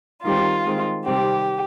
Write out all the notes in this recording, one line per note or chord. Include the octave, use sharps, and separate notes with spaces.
D#3 G3 C4 F4
D#3 G#3 C4
C3 D#3 G3 C4 G4